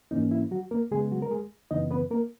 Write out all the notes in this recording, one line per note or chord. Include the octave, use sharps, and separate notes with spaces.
G#2 E3 A#3 C#4 D#4
E4
F#3 F#4
A#3 A#4
C#3 G#3 B3 G#4
F#3 F#4
A#4
G#3 G#4
F#2 C#3 E3 B3 D#4 D#5
B3 B4
A#3 A#4